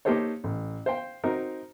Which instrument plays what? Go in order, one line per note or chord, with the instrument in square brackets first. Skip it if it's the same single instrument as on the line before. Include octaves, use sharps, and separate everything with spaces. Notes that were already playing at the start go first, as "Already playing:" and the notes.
[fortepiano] A#3 D#4 G4 A4 C5 C#5
A1
C5 F5 G5
C4 D#4 F#4 A#4